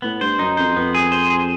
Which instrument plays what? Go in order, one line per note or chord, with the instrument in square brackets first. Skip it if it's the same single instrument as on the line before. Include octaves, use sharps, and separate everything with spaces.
[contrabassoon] A2 [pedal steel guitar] B3
[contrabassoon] G2 [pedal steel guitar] C5
[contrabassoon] F#2 [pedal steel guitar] D#4
[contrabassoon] F2 [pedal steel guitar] C5
[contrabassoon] F2 [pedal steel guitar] B3
[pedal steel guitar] G#4
C5
G#4